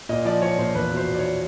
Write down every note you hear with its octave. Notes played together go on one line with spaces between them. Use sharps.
A#2 D#5
F3 D5
F3 C#5
A#2 C5
E2 B4
B2
C5
B2
D5
C#5